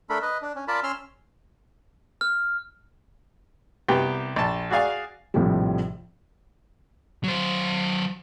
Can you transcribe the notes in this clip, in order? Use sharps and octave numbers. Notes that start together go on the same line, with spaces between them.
A3 D4 A4 A#4 B5
B4 D#5
D4
C#4
F4 A#4 D5 A5 B5
C#4 C6 E6 F6
F6
C2 B3 G4 G5
A#1 A5
F#4 G#4 D5 F5 G#5
A#1 F2 A2 C3 F3 G3
F#3 C5